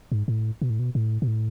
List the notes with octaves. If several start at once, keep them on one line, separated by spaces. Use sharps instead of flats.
G#2
A2
B2
A2
B2
A2
B2
A2